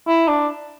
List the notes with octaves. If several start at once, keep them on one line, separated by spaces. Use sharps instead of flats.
E4
D4